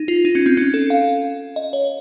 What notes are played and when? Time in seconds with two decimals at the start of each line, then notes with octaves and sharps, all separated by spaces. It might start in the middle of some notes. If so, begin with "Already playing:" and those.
Already playing: D#4
0.08 F4
0.25 D#4
0.35 C#4
0.46 C4
0.57 C#4
0.74 A4
0.90 F5
1.56 D#5
1.73 C#5